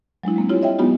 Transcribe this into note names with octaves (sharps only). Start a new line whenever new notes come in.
F#3 G#3 D4 E4
G#3 A#3 C4
G3 C4 E4 F4 G4 C#5
C#5 D#5 E5 G5
F#3 G#3 B3 D#4 F4 G4